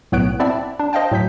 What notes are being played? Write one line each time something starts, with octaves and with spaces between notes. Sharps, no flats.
B1 A2 B3 C#5 F#6 D7
C4 E4 D5 E5 F#5 A5
D4
C5 D#5 F5 G5 A5
A2 F#3 G6 B6